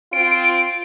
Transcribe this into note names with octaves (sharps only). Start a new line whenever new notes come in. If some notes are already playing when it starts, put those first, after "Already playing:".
C4 F4 D7